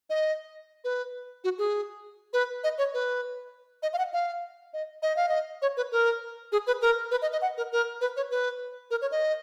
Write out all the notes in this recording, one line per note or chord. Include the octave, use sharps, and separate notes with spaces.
D#5
B4
F#4
G#4
B4
D#5
C#5
B4
D#5
F5
F#5
F5
D#5
D#5
F5
D#5
C#5
B4
A#4
G#4
B4
A#4
B4
D#5
D#5
F#5
A#4
A#4
B4
C#5
B4
A#4
C#5
D#5